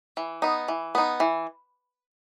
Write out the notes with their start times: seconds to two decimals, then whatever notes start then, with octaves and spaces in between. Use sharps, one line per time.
0.17 E3
0.42 B3 D#4
0.68 E3
0.95 B3 D#4
1.20 E3